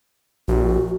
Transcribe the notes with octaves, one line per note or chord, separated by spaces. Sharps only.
A#1 F#4